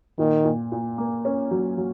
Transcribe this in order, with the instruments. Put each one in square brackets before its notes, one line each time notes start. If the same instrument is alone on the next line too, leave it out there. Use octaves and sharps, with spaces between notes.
[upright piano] A#2 [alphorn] D#3
[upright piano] A#2
A#2
A#3
C#4
F#3
F#3